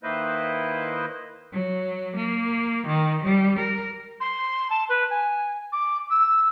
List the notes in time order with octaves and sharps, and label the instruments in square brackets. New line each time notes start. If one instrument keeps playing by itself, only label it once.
[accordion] D#3 A#3 E4 B4 C5 D#5
[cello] F#3
A#3
D#3
G3
A#4
[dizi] C6
A5
B4
G#5
D6
E6